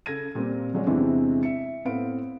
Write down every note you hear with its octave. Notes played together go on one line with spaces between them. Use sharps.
C#3 A4 G#6 A#6 D#7
A#2 G3 A#3 C4
F3 F#3 G#3 C#4 C#5 D5
E2 C3 E3 G#3 C4 D4
E5 C#7
A2 B3 C4 B4 F5 D7